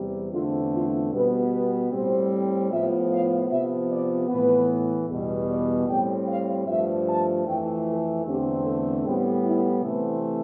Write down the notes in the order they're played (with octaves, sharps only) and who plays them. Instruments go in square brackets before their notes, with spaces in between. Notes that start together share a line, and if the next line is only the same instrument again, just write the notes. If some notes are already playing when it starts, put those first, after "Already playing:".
Already playing: [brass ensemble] E2 C3 G3
E2 D3 A3 C4 F4
F4
B2 G3 B3 B4
B4
A2 G3 C4 C5
A2 F3 B3 E5
F5
C3 F3 B3 E5
D5
A2 E3 B3 B4
E2 B2 G3
D5
A2 G3 C4 G5
F5
G2 F3 A3 E5
A5
F2 E3 A3 G5
A4
E2 D3 A3 C4 G4
A4
A2 G3 B3 G4
E4
C3 E3 A3 C4 B4